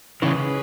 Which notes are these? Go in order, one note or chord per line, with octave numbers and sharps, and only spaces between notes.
C#3 E3 G#3 C#4 G#4 B4